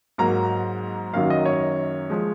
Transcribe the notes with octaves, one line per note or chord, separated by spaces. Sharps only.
G#2 F#3 A#3 A#5
F#2 D#3 F#3 A#3 F5
D#5
C#5
F3 G#3